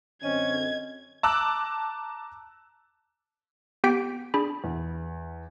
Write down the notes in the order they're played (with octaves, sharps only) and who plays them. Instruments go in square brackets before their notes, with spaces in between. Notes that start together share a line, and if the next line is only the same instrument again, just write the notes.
[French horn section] F#2 D3 C4 [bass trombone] C#4 [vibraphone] D#5 [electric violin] G#6
[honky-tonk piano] A5 A#5 D6 E6 F#6
[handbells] B3 G4 G5 G6 B6 D7
D4 G#4 B5
[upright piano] E2